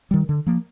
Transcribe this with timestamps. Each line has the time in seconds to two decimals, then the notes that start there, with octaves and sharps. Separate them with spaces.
0.11 D#3 G3
0.29 D3
0.46 F3 A#3